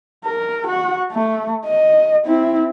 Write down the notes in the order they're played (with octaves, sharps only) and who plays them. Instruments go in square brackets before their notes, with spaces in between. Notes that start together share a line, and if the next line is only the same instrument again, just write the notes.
[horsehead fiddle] A#4
F#4 F#5
A3
D#5
C4 E4